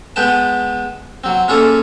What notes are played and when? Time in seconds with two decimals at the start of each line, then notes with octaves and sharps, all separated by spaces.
0.16 G#3 B3 B4 G5 A5
1.24 F#3 C4
1.48 A#3 C#4 F4 G#4 A4